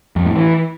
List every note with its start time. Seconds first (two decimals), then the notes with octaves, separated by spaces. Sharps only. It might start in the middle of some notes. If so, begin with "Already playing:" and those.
0.16 F2
0.26 A2
0.36 E3